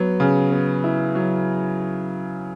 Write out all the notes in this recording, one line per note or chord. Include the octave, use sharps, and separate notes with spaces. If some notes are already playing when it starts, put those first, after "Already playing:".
Already playing: F#3 B3
C#3
B3
E4
F#3